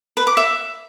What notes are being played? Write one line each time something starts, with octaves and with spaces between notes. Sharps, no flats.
B4
D6
E5